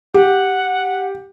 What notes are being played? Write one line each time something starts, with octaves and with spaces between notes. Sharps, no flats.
G4 F#5